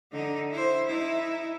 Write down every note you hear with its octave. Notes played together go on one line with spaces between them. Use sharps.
D3 D#4
E4 C5
D#4 E4